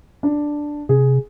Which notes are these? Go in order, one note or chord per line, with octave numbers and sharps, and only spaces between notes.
D4
C3 G#4